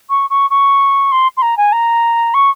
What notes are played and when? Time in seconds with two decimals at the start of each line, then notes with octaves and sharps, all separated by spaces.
0.09 C#6
0.29 C#6
0.50 C#6
1.11 C6
1.37 C6
1.42 A#5
1.57 G#5
1.72 A#5
2.34 C#6